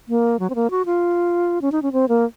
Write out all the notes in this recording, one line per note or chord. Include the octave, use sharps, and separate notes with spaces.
A#3
F#3
C4
A#3
F#4
F4
C#4
D#4
C#4
C4
A#3